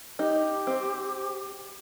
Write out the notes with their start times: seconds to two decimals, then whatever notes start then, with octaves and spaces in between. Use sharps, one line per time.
0.19 D#4 G4
0.67 C4